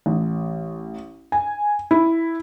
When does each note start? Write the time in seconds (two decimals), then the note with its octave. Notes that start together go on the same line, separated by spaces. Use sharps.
0.06 A1
1.32 G#5
1.91 E4